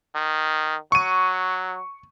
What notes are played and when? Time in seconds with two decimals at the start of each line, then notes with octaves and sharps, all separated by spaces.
0.15 D#3
0.92 F#3 C#6 D#7